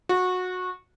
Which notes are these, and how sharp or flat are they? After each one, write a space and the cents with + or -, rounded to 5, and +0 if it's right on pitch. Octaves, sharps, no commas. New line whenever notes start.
F#4 -20